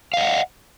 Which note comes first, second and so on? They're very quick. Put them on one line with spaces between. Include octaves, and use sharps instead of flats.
F5 D#5 F#5